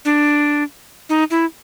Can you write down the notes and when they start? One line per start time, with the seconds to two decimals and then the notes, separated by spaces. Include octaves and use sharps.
0.05 D4
1.09 D#4
1.31 E4